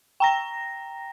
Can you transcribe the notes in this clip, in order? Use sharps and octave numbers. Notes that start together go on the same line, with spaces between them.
G5 A#5 A#6